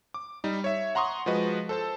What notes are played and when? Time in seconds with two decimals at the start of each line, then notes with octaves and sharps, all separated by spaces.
0.14 D6
0.44 G3 D#4
0.64 C#5 E5
0.95 F#5 A#5 C6 C#6 D#6
1.26 F3 G#3 F#4 B4 D#5
1.69 A4 C5 A5